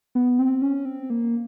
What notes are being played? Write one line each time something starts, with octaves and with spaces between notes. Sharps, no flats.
B3
C4
C#4
C4
A#3